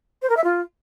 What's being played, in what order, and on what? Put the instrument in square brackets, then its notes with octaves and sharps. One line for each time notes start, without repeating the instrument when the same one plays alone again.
[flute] C5
A#4
E5
F4